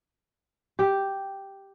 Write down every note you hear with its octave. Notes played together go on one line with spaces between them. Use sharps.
G4